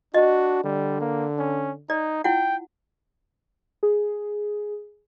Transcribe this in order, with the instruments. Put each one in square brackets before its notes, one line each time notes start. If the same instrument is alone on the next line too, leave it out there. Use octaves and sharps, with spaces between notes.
[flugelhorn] D4 [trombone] F#4 [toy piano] D#5
[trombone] D3 [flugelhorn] G3
[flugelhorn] A#3
C#4
[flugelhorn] D#4 [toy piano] D5
[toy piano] E4 F4 F#5 [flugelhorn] G5
[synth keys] G#4